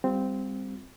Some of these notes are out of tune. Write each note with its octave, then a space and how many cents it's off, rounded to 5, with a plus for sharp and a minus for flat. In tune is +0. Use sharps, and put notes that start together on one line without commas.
G3 +25 C4 -10 F4 +15